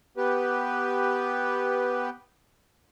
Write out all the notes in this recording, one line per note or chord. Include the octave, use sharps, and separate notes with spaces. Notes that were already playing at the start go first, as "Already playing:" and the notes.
B3 G4 B4